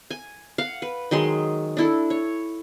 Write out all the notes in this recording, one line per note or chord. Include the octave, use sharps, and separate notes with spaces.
G#5
F5 F#5
B4
D#3 F#3 G#3 C6
D4 E4 A4
C#5